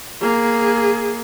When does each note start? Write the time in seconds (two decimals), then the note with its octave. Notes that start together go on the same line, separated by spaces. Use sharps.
0.21 A#3 G#4